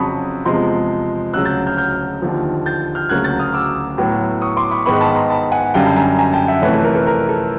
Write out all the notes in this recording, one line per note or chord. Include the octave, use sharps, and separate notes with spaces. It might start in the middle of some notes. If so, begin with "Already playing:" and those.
Already playing: F2 C#3 F#3 A5 B5 C#6 D#6
E2 C3 F3 G#3 A#5 C6
D2 C#3 F#3 E6 F#6
G6 A6
F6 G6
F6 G6
D#2 D3 F3
G6 A6
F6 G6
D2 C#3 F#3 A#3 F#6 G#6
G6 A6
D#6 F6
D6 E6
A2 F#3 B3
C#6 D#6
C6 D6
B5 C#6
G#2 D#3 G#3 B3 B5 C#6
A5 B5
A#5 C6
A5 B5
F#5 G#5
F#2 D3 G3 F5 G5
A5 B5
G#5 A#5
G#5 A#5
G5 A5
E5 F#5
F2 C3 E3 A3 B4 C#5
A4
A#4
A4 B4
A#4
A4